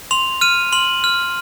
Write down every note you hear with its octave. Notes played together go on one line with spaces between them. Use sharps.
C6 F7
F6 D#7
C6 F#7
F6